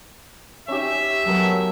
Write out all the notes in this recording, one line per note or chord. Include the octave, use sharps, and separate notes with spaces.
C#4 D#4 G4 E5
F#3 A3 B3 A#4